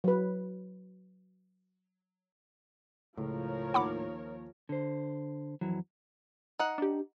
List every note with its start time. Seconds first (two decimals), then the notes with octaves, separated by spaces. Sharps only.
0.04 F#3 B4
3.18 C#2 A2 F3 A#4 C#5
3.74 D#2 F#5 B5 D6
4.69 D3 C5
5.61 F2 E3 F#3
6.59 D#4 F#5
6.78 D4 G4